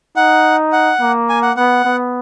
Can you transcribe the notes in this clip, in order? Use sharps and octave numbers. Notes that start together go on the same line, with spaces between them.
D#4 F#5
F#5
A#3
G#5
F#5
B3 F#5
B3